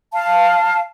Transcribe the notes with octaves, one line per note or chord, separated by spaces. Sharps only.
F5 A5